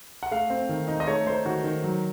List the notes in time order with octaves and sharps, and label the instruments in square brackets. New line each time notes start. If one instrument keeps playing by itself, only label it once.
[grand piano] F#5
A3 F5
C4
D#3
D#4
D#5
A3 C#5
D#4 C5
D#3 F#4
D#3
F#3